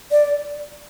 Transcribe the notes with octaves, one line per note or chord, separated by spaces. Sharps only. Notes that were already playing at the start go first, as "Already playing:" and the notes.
D5